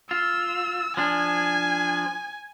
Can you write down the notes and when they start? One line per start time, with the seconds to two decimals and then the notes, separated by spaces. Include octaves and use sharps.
0.11 F4 E6
0.97 F3 D4 G#5